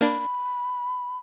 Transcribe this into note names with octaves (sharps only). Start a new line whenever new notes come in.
A#3 D4 B5